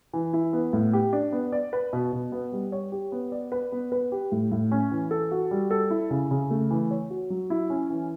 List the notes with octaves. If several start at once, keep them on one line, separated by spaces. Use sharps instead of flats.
E3
E4
B3
A2
G4
D4
B3
D5
B4
B2
B2
B3
G3
C#5
G4
B3
D5
B4
B3
B4
G4
A2
A2
C#4
E3
A4
F#4
G3
A4
E4
C#3
C#3
A3
E3
C#5
F#4
F#3
E4
C#4
E3